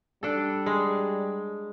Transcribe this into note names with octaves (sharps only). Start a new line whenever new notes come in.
G3 D4 A4
G#3